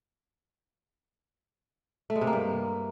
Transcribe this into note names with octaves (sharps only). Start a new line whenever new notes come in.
A3
G#3
C3
A#3
G2